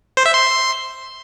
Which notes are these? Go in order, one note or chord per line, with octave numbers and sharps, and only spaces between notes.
C5
E5
C6